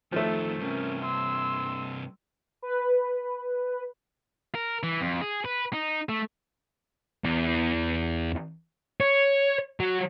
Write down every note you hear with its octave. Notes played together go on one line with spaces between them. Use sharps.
F2 D#3 F3 A3 A4
G2 C3 C#4 A#4
C6 E6
B4
A#4
E3
F2
G#4
B4
D#4
A3
E2
C#5
F#3